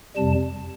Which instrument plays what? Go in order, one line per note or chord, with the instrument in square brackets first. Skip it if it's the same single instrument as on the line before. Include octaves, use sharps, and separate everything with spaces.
[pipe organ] F2 C3 G3 A5